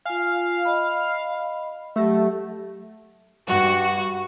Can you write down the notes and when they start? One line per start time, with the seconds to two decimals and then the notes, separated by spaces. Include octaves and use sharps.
0.05 F4 F5 G#5
0.65 D#5 B5
1.96 F#3 A3 G4 E5
3.47 G2 F#4